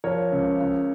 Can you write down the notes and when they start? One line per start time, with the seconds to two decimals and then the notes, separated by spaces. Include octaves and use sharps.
0.04 F3 A#4 C#5
0.32 C#2
0.60 C#2